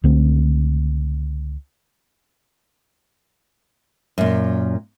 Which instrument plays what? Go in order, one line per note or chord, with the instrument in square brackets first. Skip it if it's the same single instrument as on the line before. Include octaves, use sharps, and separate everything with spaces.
[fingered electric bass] C#2 D3 A3 C4
[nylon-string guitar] F#2 A#2